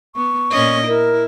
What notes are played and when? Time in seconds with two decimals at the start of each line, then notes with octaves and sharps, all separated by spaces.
0.16 B3 C#6
0.51 A#2 C#4 D#5
0.87 E4 A#4